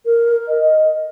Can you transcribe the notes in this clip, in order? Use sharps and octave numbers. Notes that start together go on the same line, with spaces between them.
A#4
D#5